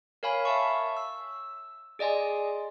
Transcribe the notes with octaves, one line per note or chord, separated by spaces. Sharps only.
A#4 C#5 F5 G#5 B5
E5 A5 C#6
E6
G#4 D5 D#5 G#5 C6